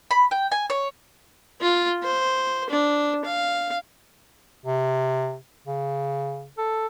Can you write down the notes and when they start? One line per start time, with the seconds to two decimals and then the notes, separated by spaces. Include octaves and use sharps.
0.11 B5
0.31 G5
0.52 G#5
0.70 C#5
1.61 F4
2.03 C5
2.70 D4
3.25 F5
4.66 C3
5.67 C#3
6.58 A4